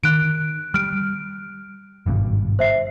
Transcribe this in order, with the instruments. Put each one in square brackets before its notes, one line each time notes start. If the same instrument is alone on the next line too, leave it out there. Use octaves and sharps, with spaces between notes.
[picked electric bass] D#3 [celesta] F#6 D7
[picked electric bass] G3 [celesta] F6 D7
[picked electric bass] G#1 G2 B2
[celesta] C5 E5 C7